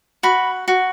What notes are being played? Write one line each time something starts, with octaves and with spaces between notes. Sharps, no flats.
F#4 B5
F#4